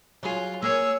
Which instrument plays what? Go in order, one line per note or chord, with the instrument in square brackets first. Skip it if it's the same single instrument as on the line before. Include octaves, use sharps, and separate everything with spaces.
[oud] F#3 G#4 [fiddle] F4
[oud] A#3 [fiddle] G#4 C#5 [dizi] E6